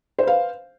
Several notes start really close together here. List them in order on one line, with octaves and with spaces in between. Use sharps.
C5 B4 F5